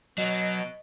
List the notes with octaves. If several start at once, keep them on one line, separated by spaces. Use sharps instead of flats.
B2 F#3 D#5